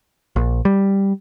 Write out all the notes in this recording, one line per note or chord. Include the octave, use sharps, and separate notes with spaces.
A#1
G3